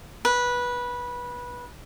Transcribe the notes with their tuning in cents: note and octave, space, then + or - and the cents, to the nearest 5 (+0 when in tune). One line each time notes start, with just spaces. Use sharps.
B4 -15